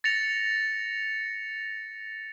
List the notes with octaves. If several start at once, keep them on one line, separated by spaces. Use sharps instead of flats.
A6 A#6 C#7 F7